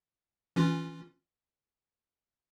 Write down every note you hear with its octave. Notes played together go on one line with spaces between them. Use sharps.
E3 C#4 F4